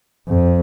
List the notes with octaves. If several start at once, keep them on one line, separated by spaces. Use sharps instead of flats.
F2